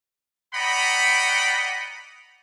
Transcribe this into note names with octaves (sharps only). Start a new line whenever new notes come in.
D5 D#5 F#5 G5 A#5 B5